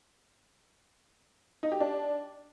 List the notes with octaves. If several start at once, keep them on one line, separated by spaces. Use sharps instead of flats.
D#4
G4
D4